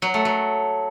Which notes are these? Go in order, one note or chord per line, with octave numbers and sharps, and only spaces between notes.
F#3
A3
F#3